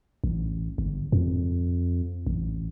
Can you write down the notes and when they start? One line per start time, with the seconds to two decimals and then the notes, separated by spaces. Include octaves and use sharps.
0.24 A1
0.78 G1
1.12 F2
2.27 A1